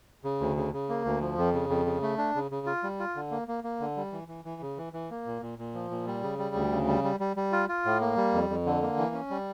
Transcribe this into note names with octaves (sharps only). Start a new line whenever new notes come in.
C#3
D2
C#3
C#3
A#3
D2
F3
F2
C#3
F2
C#3
A3
D4
C#3
C#3
F4
G3
F4
D3
A#3
A#3
A#3
D3
G3
E3
E3
E3
C#3
E3
E3
A#3
A#2
A#2
A#2
F3
A#2
G3
C#3
G3
D2
C#3
G3
G3
G3
G3
F4
F4
A2
A#3
G3
F2
F2
D3
A#3
E3
C#4
G3